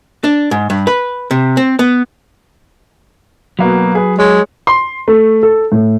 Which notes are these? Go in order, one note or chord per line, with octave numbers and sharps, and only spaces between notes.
D4
G#2
G2
B4
C3
C4
B3
B2 F#3 A#3 B3
G#4 B4
G#3 C#5
C6
A3
A4
A2